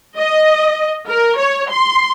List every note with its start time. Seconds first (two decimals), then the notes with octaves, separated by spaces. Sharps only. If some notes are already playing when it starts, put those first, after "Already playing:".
0.18 D#5
1.09 A#4
1.38 C#5
1.71 C6